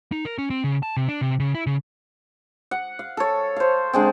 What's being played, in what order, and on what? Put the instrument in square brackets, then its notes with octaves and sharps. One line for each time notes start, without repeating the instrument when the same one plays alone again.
[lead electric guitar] D#4
A#4
C#4
C4
C#3
A5
C3
D4
C3
C#3
E4
C#3
[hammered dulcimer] F#5
F5
A4 C#5
C5 F5
D3 G#3 C4